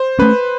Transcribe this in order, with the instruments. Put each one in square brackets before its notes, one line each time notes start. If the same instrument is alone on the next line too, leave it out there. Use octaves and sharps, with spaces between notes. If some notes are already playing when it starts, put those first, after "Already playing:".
Already playing: [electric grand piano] C5
[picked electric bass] A3 C#4 [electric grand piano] B4